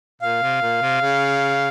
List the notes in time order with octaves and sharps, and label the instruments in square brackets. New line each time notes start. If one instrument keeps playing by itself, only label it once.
[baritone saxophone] A#2 [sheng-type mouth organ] F5
[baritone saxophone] C3
A#2
C3
C#3